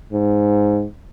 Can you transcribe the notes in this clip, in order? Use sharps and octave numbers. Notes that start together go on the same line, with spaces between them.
G#2